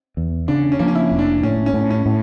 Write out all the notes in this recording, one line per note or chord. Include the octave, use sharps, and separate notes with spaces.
E2
C#3 D4
C#4
F3 A#3
C#4
E4
F1
D4
A2 C#4
C#4
A2
C#4
A2